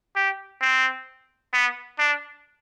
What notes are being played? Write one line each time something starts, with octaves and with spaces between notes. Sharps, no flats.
G4
C4
B3
D4